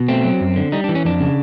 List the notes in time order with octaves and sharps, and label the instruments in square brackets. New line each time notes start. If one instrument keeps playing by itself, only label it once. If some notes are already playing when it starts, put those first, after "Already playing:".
Already playing: [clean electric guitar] B2
A3 C4
F#3
F#2
D3
G3 D#4
E3 D4
C#4
F2 D4
C#3